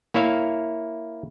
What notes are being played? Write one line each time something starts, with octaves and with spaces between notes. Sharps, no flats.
A#3 E4 C#5 E5 F5